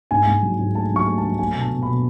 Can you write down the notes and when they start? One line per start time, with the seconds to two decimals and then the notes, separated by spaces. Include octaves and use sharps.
0.11 G#2 G#5
0.27 G#2
0.43 F#3
0.59 G#2
0.75 A3 A5
0.91 F#3
0.96 C#6
1.07 A3
1.18 A5
1.23 F#3
1.39 A3 G#5
1.55 B2
1.61 A5
1.71 B2
1.83 B5
1.88 B2